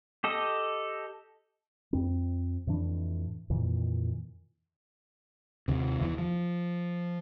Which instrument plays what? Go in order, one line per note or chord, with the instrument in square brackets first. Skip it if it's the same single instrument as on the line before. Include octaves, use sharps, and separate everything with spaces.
[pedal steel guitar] G4 A4 D#5
[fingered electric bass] F2 C4
F2 A2 E3 D4
F2 A#2 D#3 E3
D#2 C3
E2 E3
F3